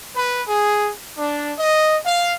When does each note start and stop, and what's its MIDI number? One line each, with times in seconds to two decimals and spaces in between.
0.16 0.43 71
0.48 0.92 68
1.17 1.54 62
1.59 1.98 75
2.06 2.34 77